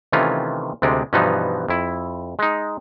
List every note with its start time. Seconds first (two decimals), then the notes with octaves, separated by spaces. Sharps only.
0.12 C3 D#3 E3 A3 C#4 F4
0.82 D2 C3 G#3 D5
1.13 G2 B2 E3 F3 B3 D#4
1.68 F2 E4
2.39 G#3 D#4